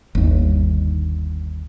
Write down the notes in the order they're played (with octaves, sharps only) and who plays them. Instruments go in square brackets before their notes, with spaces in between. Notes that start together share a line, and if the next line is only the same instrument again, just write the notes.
[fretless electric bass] G1 D#2